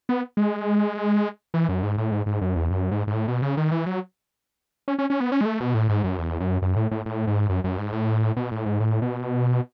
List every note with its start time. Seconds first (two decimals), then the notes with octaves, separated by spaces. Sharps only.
0.09 B3
0.37 G#3
1.54 E3
1.69 F#2
1.83 G#2
1.98 A2
2.11 G#2
2.26 G#2
2.41 F#2
2.56 E2
2.70 F#2
2.91 G#2
3.07 G#2
3.13 A2
3.28 B2
3.42 C#3
3.57 D#3
3.71 E3
3.86 F#3
4.88 C#4
4.99 C#4
5.10 C#4
5.20 B3
5.32 C#4
5.41 G#3
5.46 A3
5.60 B2
5.74 A2
5.89 G#2
6.04 F#2
6.18 E2
6.40 F#2
6.62 F#2
6.76 A2
6.91 A2
7.06 A2
7.27 G#2
7.49 F#2
7.64 F#2
7.78 G#2
7.93 A2
8.37 B2
8.51 A2
8.66 G#2
8.80 A2
9.02 B2